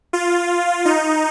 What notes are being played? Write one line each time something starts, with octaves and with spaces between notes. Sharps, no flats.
F4
D#4